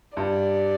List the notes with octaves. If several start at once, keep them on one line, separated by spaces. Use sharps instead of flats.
G2 D5